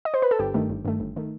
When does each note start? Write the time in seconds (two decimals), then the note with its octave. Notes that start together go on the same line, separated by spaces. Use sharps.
0.05 D#5
0.14 C5
0.22 B4
0.31 A4
0.39 G1 G4
0.54 G2 D#3 A3
0.70 G1
0.85 G2 D#3 A3
1.00 G1
1.16 D#3 A3